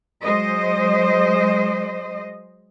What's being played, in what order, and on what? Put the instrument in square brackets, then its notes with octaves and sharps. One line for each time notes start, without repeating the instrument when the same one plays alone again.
[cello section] F#3 G#3 C5 D#5